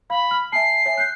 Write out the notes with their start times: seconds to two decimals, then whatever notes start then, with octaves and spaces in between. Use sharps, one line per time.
0.10 F5 B5
0.31 F6
0.52 E5 G#5 A5 C7
0.86 C#5 E5 G#5
0.97 F#6 G6